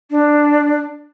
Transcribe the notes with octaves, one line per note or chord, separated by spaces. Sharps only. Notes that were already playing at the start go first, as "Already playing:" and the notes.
D4